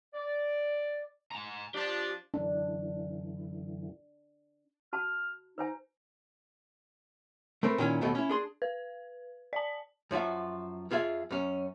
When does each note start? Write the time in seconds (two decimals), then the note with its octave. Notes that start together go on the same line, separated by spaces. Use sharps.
0.14 D5
1.32 G#5 A#5
1.75 F3 D4 G4
2.34 F#2 D3 E3 D4
4.93 F#4 A5 F6
5.58 D#4 B4 C5 G#5
7.63 A3 C4 A#4 B4
7.78 A#2 D#3 C#4 E4
8.01 D#2 B2 A3 B3
8.15 C#4 E4
8.29 D4 G#4 C6
8.62 B4
9.53 D5 A5
10.11 F#2 F3 F#4 E5
10.91 F2 F4 G#4 E5
11.31 F#2 C#4